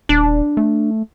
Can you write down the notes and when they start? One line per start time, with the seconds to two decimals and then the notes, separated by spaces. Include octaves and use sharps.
0.09 D#1 D4
0.57 A3